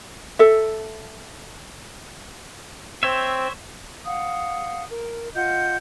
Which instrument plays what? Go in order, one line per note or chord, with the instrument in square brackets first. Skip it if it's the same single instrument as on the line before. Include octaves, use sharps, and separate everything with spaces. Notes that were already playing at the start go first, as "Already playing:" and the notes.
[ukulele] A4 E5
[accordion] C4 [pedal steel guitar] C5 C#5 E5
[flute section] F5 F#5 D#6
A#4
F4 D#5 F#5 G6